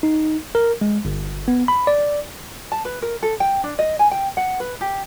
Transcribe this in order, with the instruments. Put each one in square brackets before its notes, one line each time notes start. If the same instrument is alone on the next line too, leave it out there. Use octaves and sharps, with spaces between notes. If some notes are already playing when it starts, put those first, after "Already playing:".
[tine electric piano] D#4
A#4
G#3
G1
B3
B5
D5
[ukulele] A5
B4
A#4
A4
G5
D4
D#5
G#5
G5
F#5
B4
G4